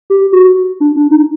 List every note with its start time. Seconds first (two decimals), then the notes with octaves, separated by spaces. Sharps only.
0.10 G4
0.32 F#4
0.80 D4
0.96 D4
1.11 D#4